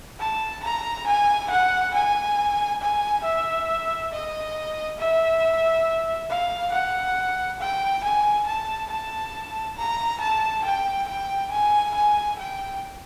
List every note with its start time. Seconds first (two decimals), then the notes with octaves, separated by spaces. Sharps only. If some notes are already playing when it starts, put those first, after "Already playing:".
0.20 A5
0.64 A#5
1.07 G#5
1.50 F#5
1.94 G#5
2.81 G#5
3.24 E5
4.12 D#5
4.99 E5
6.30 F5
6.72 F#5
7.60 G5
8.04 G#5
8.47 A5
8.90 A5
9.77 A#5
10.21 A5
10.65 G5
11.08 G5
11.51 G#5
11.94 G#5
12.39 G5